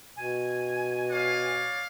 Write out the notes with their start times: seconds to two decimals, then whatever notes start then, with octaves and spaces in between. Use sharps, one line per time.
0.17 B2 G#5
1.09 C#5 D5 F5